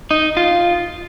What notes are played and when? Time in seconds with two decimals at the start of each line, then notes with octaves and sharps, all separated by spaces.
0.11 D#4
0.37 F4